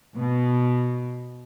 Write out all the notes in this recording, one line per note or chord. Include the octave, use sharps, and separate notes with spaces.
B2